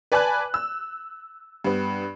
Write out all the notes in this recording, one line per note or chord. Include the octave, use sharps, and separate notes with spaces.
B4 D5 G#5 A5 B5 F#6
E6
G2 B3